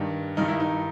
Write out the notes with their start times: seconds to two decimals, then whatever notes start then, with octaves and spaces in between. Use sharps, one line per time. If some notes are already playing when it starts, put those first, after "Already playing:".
Already playing: G2 D#3 D4
0.37 G2 D#3 D#4
0.48 E4
0.60 D#4